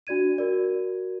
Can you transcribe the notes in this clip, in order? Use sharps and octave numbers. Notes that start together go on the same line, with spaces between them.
D4 F#4 D5 G#6 D#7
F#4 A#4 D5